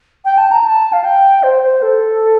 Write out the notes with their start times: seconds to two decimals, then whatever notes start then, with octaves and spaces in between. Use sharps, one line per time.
0.25 G5
0.38 A5
0.51 A#5
0.64 A5
0.93 F5
1.04 G5
1.43 C5
1.63 C5
1.82 A4